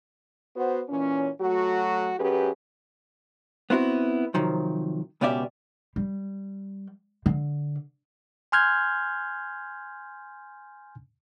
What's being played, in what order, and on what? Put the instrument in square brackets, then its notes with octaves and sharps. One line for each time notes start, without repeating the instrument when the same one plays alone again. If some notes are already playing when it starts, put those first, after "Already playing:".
[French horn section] B3 F#4 C5
A#2 E3 C#4
F#3 A3 F#4
F#2 C#4 G4 G#4 B4
[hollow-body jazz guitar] B3 C4 E4 F#4
C3 D#3 F3 F#3
C#2 B2 C#4 G4 D5 E5
[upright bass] G3
D3
[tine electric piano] G#5 C6 F6 G6 G#6